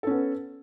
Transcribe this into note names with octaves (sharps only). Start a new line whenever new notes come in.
B3 C#4 A4